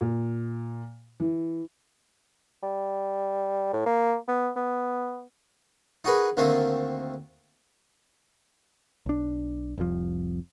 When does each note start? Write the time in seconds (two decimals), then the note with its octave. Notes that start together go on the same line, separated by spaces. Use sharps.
0.01 A#2
1.20 E3
2.63 G3
3.73 A2
3.86 A#3
4.28 B3
4.56 B3
6.04 D#4 F#4 G#4 A#4 B4
6.37 D2 D#3 A3 A#3 C4
9.06 B1 D4
9.78 F1 C2 F2 F3